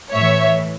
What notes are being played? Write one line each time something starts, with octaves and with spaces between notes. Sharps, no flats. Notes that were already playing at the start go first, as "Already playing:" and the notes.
A2 E3 C#5 E5